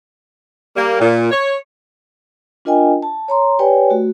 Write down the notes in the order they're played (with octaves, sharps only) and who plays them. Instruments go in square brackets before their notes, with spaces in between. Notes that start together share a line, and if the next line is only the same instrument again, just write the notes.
[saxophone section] G3 A#3
A#2
C#5
[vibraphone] D4 F4 A#4 D#5 G5 G#5
A5
C#5 A#5 C6
G4 B4 C#5 D5 G5 G#5
A3 F#4